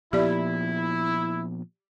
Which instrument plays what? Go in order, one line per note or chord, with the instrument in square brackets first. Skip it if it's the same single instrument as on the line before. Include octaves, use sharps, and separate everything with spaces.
[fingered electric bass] A#2 F3 B3 [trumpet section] E4 [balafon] G4 D5